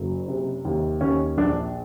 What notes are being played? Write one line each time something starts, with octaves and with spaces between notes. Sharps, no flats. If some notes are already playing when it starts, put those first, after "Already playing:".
Already playing: F#1 F#3
C3
D#2
D#2 C#4
A#1 D4